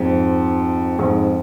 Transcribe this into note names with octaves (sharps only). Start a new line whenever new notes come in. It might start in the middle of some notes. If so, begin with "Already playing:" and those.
Already playing: F2 G#2
F2 G#2